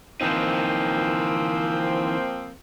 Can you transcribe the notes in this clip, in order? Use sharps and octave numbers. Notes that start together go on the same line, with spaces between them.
E3 F3 A#3 C4 D#4